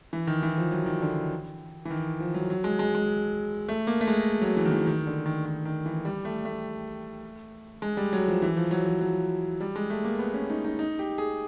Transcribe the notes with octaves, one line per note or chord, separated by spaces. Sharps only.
E3
D#3
E3
F3
F#3
D#3
D3
E3
D#3
F3
F#3
F#3
G#3
G#3
G#3
A3
A#3
A3
G#3
F#3
E3
D#3
E3
D#3
D3
D#3
D#3
D#3
E3
G3
A3
A3
G#3
G3
F#3
F3
E3
F3
F#3
F3
F#3
G3
G#3
A3
A#3
B3
C#4
D#4
D#4
D#4
G4
G#4